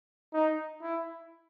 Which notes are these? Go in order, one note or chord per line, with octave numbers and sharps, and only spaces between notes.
D#4
E4